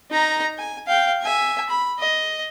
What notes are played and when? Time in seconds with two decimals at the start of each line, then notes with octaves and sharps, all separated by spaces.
0.11 D#4 A#5
0.58 G#5
0.87 F5 G5
1.21 E5 G#5
1.70 B5
1.99 D#5